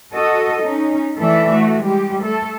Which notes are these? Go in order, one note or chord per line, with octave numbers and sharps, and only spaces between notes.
F#4 A4 D#5
C#4 D#4
E3 A3 A4 D5 E5
A3 F#4
G3 G#3 G4
A3 A4